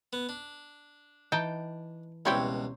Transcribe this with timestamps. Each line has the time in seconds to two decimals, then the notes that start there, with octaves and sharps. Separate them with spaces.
0.13 B3
0.29 D4
1.32 E3 D#4 G5 A5
2.25 C#2 B2 G3 C4 E4 G4 C#5 A#5